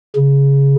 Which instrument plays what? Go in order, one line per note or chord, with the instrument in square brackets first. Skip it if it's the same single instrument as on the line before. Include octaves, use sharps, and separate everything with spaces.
[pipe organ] C#3